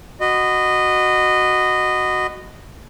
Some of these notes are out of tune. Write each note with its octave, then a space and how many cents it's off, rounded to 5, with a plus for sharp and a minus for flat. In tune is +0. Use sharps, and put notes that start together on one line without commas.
F#4 +0 D#5 -15 B5 +25